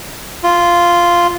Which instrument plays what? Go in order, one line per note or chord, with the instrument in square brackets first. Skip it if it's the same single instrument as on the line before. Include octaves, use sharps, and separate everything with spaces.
[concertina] F4